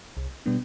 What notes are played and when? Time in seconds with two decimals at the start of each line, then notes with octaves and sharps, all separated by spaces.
0.17 C2
0.46 B2 G3 B3 D4